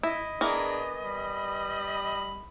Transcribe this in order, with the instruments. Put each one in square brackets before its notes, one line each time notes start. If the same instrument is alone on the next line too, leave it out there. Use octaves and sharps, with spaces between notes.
[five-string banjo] E4 [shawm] D#5
[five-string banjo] E3 B3 A#4 [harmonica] D4 G#4
[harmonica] G3 B5